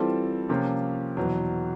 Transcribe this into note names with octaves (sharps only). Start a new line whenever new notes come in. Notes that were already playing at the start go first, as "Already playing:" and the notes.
Already playing: E3 G3 C4 F4 A4
C3 F3 A#3 C#4 F4
E2 B2 F#3